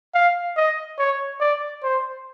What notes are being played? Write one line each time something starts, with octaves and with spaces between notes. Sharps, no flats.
F5
D#5
C#5
D5
C5